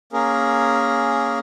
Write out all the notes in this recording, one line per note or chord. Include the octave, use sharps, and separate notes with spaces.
A#3 C#4 G#4 A#4